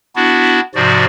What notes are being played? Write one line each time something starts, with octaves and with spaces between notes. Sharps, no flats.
B3 D4 E4 F#4
G#2 C3 F3 F#4 D5